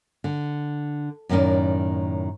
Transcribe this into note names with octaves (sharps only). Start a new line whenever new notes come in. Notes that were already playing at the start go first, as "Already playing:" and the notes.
D3
F#2 A2 D#3 A#3 C#4 D5